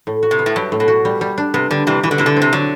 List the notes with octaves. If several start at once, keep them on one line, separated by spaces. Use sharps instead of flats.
A2
F#4
C3
B3
A2
G2 F#3
A2
B2
F#4
G3
G3
D4
C3 B3
D3 G3
C3 E3 G3
B2 E3
D3
C3 E4
D3
C4
C3
D3 F#3